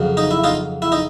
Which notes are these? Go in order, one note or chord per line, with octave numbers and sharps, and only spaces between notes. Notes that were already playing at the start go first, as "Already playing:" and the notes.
Already playing: F2 C#3 F#3
D#4
E4
D#4 F4
E4
D#4